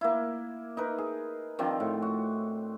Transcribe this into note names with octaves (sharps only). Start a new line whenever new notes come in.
A#3 E4
D#4 A#4 B4
G#4
D#3 F3 C4 D4
A2
F#4